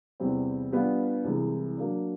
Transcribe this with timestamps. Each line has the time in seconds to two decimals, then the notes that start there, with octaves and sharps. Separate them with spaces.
0.20 E2 C3 E3 G3 C4
0.72 G3 B3 D4 F4
1.24 C2 C3 E3 G#3
1.77 F#3 A#3 D4